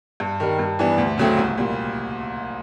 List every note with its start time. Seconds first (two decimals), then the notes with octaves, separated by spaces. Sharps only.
0.20 G2
0.40 D#3 G3
0.59 G2
0.79 E3 G3 B3 D4
0.98 D2
1.18 C#3 F#3 A3 C4
1.38 C2
1.58 A#2 G3